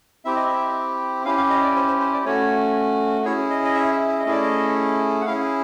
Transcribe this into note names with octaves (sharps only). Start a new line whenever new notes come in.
C4 E4 G4 E5
D#5
E5
C#4 E4 G4 F5
F5
D#5
D5
C5
C5
C5
D5
A3 C#4 F#4 C#5
C#4 E4 G#4 C#5
D#5
D#5
E5
E5
E5
D#5
A3 C#4 E4 G#4 D5
D#5
F#5
C#4 E4 G#4 F5